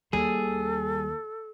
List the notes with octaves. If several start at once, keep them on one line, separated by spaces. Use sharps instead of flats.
D#2 G3 G#4 A4